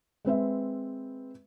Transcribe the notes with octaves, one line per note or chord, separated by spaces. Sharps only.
G#3 C4 B4 E5